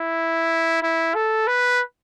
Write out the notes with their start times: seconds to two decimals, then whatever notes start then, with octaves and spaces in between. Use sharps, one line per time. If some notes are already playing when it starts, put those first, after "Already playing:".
Already playing: E4
0.83 E4
1.15 A4
1.47 B4